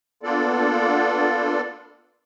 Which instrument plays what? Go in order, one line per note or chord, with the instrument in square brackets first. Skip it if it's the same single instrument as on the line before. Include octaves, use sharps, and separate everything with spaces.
[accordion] A#3 B3 D4 F4 A4 D5